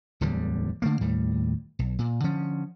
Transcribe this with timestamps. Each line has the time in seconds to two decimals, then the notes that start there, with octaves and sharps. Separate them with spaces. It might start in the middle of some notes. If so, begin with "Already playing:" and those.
0.21 D1 E2 D3 G3
0.82 D3 A3 A#3
1.01 D#2 A2 G3
1.79 B1
1.99 A#2
2.24 D3 F3 C#4